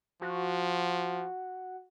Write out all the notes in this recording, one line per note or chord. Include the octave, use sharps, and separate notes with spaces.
F3 F#4